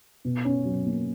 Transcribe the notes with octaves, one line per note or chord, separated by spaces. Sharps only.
B2
C#4
F#3
A#3